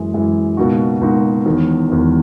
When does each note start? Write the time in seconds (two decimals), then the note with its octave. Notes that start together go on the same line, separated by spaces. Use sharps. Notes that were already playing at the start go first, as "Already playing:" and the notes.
Already playing: F#2 E3 G#3
0.14 F#2 E3 G#3
0.57 C#2 B2 A#3 D#4 F#4
1.01 C#2 B2 A#3 D#4 F#4
1.46 E1 E2 D#3
1.90 E1 E2 D#3